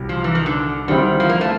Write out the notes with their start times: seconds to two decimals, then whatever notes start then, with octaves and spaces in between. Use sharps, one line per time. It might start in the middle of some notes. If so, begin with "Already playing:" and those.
Already playing: C2 B2 G3
0.09 F3
0.24 E3
0.35 D#3
0.46 D3
0.88 D3 D#3 G3 C4 E4
1.20 F3
1.29 A#3
1.41 A3